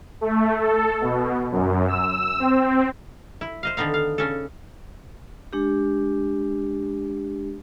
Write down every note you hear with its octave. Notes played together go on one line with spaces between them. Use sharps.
A3
A4
B2
F#2
E6
C4
E4
C5 D#5 F5
D3 D#3 B3 D#4 F5
F5
C#3 C#4 A4
G#3 D4 G4